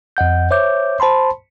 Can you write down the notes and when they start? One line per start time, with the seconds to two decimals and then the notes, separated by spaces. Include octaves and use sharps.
0.17 F2 D#5 F#5 G6
0.51 C5 C#5 E5 D6 G6
1.00 C5 A5 B5 C6